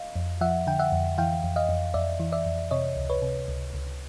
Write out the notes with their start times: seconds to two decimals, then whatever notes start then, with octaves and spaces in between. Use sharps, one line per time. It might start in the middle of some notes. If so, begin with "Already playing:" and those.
Already playing: D#5 F5
0.16 F2
0.41 F3 E5 F#5
0.67 D3 G5
0.79 E5 F#5
0.92 F2
1.18 E3 F5 G5
1.44 F2
1.56 D#5 F5
1.69 F2
1.94 F2 D5 E5
2.20 E3
2.32 D5 E5
2.46 F2
2.71 C3 C#5 D#5
2.96 C#2
3.10 B4 C#5
3.22 C3
3.48 C#2
3.73 C#2